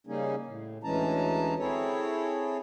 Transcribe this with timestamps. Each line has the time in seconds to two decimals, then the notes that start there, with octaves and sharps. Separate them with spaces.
0.07 C#3 G3 A#3 C#4 D#4 G#4
0.47 A2
0.84 D2 E3 G#3 C#4 A5 A#5
1.59 C4 E4 G#4 A4 C#5